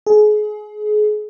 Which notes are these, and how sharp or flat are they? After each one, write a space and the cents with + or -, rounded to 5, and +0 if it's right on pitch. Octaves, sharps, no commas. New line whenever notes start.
G#4 +30